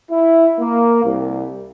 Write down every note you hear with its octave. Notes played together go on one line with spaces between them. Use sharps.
E4
A#3
C2